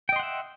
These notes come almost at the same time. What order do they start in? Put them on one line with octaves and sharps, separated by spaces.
G5 D#5 C6 F#5 E5